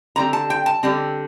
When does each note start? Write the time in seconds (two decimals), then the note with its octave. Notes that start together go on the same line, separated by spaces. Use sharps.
0.16 D3 G3 C4 A#5
0.33 A5
0.50 G5
0.66 A5
0.83 D3 G3 C4